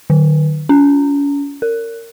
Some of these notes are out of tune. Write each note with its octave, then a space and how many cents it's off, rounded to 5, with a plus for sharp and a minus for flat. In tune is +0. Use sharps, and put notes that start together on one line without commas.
D#3 -45
C#4 +40
A#4 -25